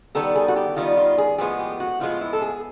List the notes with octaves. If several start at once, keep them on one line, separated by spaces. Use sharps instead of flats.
D#3 G3 B3 A4
G#4
F#4
G4
D#3 G3 B3 F4
F4
G#4
A2 F3 G#3 B3 G#4
G4
F#4
A2 F3 G#3 B3 F4
E4
A4
G#4